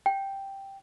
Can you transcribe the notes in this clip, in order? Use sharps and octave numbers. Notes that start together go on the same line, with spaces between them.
G5